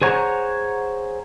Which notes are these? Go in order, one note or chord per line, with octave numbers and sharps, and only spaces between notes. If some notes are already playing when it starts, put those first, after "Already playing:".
G#4 C5 C#5 F#5 A#5